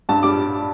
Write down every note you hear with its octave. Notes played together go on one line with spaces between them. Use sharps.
G2 A5
G3 D6